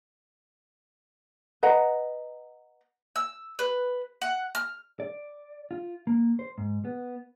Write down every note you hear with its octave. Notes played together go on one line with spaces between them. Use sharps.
B4 D#5 F#5 A#5
E6
B4
F#5
F6
D5
F4
A#3
C5
G#2
B3